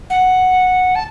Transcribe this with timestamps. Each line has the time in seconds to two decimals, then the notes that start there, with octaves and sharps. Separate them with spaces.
0.10 F#5
0.95 A5